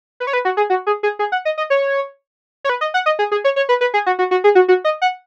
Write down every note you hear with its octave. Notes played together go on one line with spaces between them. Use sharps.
B4
C#5
B4
F#4
G#4
F#4
G#4
G#4
G#4
F#5
D#5
D#5
C#5
C#5
B4
D#5
F#5
D#5
G#4
G#4
C#5
C#5
B4
B4
G#4
F#4
F#4
F#4
G#4
F#4
F#4
D#5
F#5